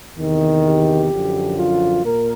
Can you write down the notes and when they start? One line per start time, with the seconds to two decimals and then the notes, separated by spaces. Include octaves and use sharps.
0.18 E2 C3 D#3
0.65 G4
1.11 F#2 D3 F3
1.58 F4
2.05 A#2 A#4